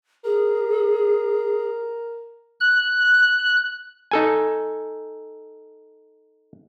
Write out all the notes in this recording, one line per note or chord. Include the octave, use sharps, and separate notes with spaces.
G#4 A#4
F#6
D#4 A4 G#5